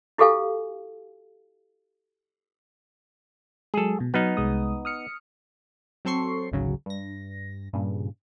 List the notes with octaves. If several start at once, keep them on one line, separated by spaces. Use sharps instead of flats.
E4 F#4 G4 A4 F5 G#5
F#3 G#3 G#4 A4
B2
F#3 B3 D#4 F6
C2 G#3 D#6
D#6 F6 C#7
F#3 C4 A4 C6 C#6 C7
G#1 D2 C#3 F#3
G2 A#6
G2 A#2 C#3